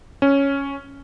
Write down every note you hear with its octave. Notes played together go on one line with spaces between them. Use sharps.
C#4